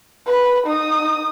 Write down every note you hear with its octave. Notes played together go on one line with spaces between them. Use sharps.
B4 B5
D#4 D#6